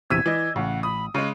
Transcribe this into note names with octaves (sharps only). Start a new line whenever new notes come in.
A#1 E2 C3 E6 G#6 B6 D#7
E3 D5 D#5
A1 C#3 F#5
B5 D#6
C#3 G#3 D#7